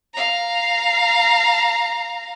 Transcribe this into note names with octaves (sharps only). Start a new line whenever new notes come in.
F5 A#5